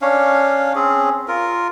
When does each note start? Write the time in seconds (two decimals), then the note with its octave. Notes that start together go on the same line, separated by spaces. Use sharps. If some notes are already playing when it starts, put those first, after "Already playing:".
0.02 C#4 D4 C#5 F5
0.75 C4 C#4 G#4
1.28 F4 A#4